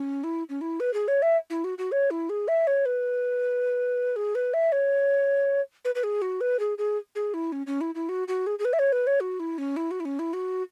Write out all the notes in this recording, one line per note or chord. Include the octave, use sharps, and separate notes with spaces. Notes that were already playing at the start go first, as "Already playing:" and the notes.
Already playing: C#4
E4
C#4
E4
B4
G#4
C#5
E5
E4
F#4
F#4
C#5
E4
G#4
E5
C#5
B4
G#4
B4
E5
C#5
B4
B4
G#4
F#4
B4
G#4
G#4
G#4
E4
C#4
C#4
E4
E4
F#4
F#4
G#4
G#4
B4
E5
C#5
B4
C#5
F#4
E4
C#4
E4
F#4
E4
C#4
E4
F#4